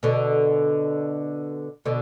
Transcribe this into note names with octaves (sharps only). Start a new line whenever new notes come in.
B2 D3
B2 D3